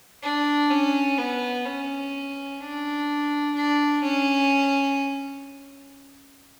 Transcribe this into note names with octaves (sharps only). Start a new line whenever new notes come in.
D4
C#4
B3
C#4
D4
D4
C#4